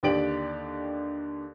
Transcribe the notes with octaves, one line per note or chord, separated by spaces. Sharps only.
D#2 D3 G4 D5 D7 F#7